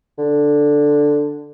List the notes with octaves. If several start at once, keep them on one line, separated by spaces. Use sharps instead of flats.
D3